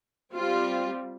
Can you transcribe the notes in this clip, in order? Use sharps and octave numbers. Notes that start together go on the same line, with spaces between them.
G3 C4 F4